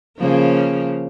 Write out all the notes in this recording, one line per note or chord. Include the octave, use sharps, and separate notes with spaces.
C#3 F3 A#3